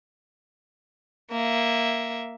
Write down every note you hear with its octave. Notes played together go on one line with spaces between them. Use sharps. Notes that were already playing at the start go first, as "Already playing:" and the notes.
A#3 E5